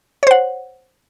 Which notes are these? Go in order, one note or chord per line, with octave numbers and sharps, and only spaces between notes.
C5 C#5 F#5